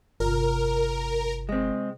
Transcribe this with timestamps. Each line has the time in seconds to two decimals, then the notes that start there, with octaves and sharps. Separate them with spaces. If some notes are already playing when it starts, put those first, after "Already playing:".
0.20 G1 C3 F4 A#4
1.49 G#3 C4